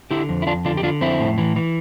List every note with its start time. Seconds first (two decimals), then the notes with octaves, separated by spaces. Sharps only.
0.11 D3 E4 G4
0.29 F2
0.42 E4
0.47 F2 D4 F4
0.65 D3 D4 F4
0.77 G4
0.83 D3 D4 F4
1.01 F2 C4 E4
1.20 A2
1.38 E3
1.56 E3